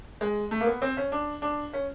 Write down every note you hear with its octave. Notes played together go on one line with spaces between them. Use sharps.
G#3
A3
A#3
B3
C4
C#4
D4
D4
C#4